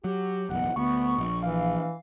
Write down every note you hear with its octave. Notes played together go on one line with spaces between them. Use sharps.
F#3 G4
F#1 B1 E2 F#5
D2 B3 C#6
A#1
E3 F5